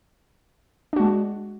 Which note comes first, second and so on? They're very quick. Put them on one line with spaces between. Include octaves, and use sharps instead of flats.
D4 F#4 G#3